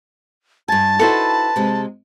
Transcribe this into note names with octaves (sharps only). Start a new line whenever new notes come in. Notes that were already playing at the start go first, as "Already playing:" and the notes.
G2 G#5 A5
D#4 E4 F#4 A4 B4 C5
C3 G#3